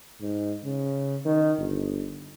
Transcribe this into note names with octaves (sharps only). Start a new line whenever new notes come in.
G#2
C#3
D#3
G1